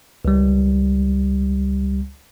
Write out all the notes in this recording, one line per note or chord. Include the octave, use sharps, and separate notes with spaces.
C#2 G3